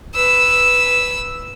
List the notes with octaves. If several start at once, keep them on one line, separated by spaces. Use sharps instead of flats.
B4 E6